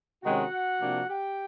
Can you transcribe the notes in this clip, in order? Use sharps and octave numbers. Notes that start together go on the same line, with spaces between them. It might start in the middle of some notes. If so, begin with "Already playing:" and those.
C3 D#3 G#3 C#4 F#4 F#5
C3 F3 A#3 D4
G4 G5